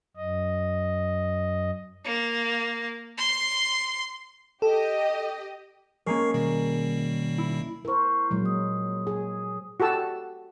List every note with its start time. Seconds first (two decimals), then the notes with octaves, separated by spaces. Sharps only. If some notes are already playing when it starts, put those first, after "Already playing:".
0.16 F#2 D#5
2.05 A#3
3.18 C6
4.62 G4 A4 D#5
6.06 G#3 A#3 C#4 A#4 C#6 C7
6.34 B2 D#3 G3
7.38 E4
7.85 E4 A#4 C5 C#6
8.31 A#2 F#3 G#3
8.46 D#6
9.07 G#4
9.80 F#4 G4 A4 A5 E6